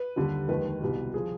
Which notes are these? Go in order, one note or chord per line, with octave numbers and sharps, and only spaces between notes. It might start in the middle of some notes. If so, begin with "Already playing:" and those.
Already playing: B4
D#2 D3 G3
F1 D#2 D#3 G#3 B4
C2 B2 G3
F3 G#4